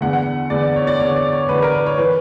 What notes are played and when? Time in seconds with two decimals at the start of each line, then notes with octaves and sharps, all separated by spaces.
0.01 E2 D3 F#5
0.13 F#5
0.50 E2 D3 D5
0.63 D5
0.76 C#5
0.87 D5
1.00 E2 D3 C#5
1.16 D5
1.33 C#5
1.49 E2 D3 B4
1.62 A#4
1.74 B4
1.86 C#5
1.98 E3 B4